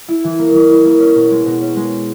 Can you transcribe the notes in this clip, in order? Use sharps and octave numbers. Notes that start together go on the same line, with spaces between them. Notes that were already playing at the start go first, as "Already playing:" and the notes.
E4
E3
A#3
E3
E4
A#3
C#4
B2
G#3
B2
C#4
G#3